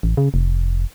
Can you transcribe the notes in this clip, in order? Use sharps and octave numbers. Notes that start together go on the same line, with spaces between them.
A1
C#3
F1